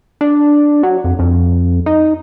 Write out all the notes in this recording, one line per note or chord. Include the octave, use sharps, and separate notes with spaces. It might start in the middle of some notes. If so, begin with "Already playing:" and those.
D4
F#3
F2
F2
D#4